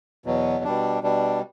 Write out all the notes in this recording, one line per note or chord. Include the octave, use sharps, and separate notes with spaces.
E2 B2 F#3
B2 G3 D4
B2 G3 D4